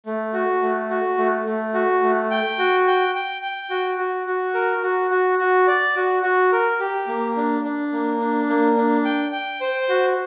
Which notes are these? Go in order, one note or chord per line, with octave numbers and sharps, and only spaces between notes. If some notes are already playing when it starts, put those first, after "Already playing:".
A3
F#4
A3
F#4
A3
A3
F#4
A3
G5
F#4
G5
G5
G5
F#4
F#4
F#4
A#4
F#4
F#4
F#4
D5
F#4
F#4
A#4
G4
A#3
D4
D4
A#3
D4
A#3
D4
G5
G5
C5
F#4